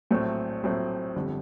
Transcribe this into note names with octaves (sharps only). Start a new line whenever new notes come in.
A#1 A2 F#3 A3 C4
A#1 A2 F#3 A3 C4
G1 F2 D3 G3